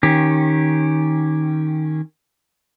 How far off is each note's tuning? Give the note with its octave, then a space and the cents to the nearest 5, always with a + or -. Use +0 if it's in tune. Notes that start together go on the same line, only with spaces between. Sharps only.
D#3 +0 C#4 -15 G4 -5